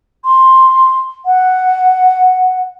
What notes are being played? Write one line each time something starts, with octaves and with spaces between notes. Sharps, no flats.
C6
F#5